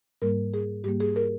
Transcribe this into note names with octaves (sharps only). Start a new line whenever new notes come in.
G#2 G3 A#3 A#4
G#4
G#2 G3 A#3 G4
G#4
A#4